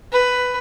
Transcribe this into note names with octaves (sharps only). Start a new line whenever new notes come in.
B4